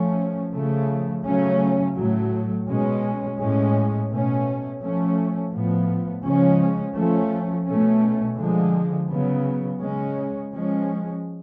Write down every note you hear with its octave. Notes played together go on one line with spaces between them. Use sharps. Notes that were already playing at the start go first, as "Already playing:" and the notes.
Already playing: F3 A3 C#4
C#3 F3 A3
C#3 F#3 A3 C#4
A2 F#3 A3
B2 G#3 C#4
A2 G#3 C#4
B2 A3 C#4
F3 A3 C#4
A2 F3 B3
C#3 F3 G#3 C#4
F3 A3 C#4
B2 A3 C#4
D3 F3 G#3
C#3 F#3 B3
C#3 G#3 C#4
F3 G#3 C#4